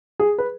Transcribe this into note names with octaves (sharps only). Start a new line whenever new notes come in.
G#4
B4